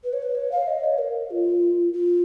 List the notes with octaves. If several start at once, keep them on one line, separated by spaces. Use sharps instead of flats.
B4
C#5
B4
C#5
F5
D#5
C#5
A#4
F4
F4